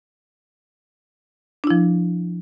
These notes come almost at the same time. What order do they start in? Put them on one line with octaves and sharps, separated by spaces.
D4 E4 F3